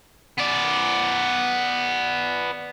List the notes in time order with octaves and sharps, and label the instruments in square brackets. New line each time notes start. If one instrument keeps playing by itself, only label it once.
[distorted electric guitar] B3 D5